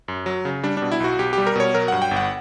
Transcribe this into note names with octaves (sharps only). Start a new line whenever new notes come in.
F#2
F#3
C#3
G3 D4
D4
B2
E4
B1 F#4
B1 G4
G3 G4
A#4
B2 C#5
F#3 A#4
G2 F#5
G5
G1
F#5